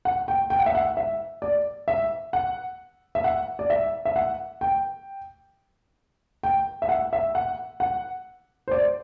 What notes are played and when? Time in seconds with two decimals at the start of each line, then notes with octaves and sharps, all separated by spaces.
0.05 F#5
0.28 G5
0.50 G5
0.59 F#5
0.66 E5
0.75 F#5
0.97 E5
1.42 D5
1.88 E5
2.33 F#5
3.15 E5
3.24 F#5
3.59 D5
3.70 E5
4.05 E5
4.16 F#5
4.61 G5
6.43 G5
6.82 E5
6.89 F#5
7.13 E5
7.35 F#5
7.80 F#5
8.68 C5
8.71 D5